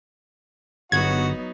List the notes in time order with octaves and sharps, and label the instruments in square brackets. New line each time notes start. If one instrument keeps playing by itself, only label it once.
[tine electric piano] G1 [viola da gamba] F#3 B3 D#4 [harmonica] F#4 F#5 [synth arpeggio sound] G#6